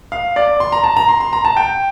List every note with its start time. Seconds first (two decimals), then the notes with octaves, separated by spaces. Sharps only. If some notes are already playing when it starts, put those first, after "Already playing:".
0.12 F5
0.36 D5
0.60 C6
0.72 A#5
0.84 A5
0.97 A#5
1.08 C6
1.20 C6
1.33 A#5
1.45 A5
1.57 G5